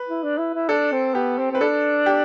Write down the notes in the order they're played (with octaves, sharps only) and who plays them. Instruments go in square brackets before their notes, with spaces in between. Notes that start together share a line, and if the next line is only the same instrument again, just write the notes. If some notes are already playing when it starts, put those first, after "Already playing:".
Already playing: [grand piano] B4
[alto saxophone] E4
D4
E4
E4
[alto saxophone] D4 [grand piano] A4
[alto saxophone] C4
[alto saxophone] B3 [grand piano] G4
[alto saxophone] C4
[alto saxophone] C4 [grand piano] B4
[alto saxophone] D4 [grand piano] A4
[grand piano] G4